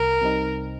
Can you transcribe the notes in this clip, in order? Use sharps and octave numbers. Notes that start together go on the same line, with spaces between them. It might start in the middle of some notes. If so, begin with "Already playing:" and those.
Already playing: C2 A#4
C3 G3 C4 D#4